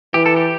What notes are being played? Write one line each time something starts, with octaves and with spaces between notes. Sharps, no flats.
E3 G4
A4
G4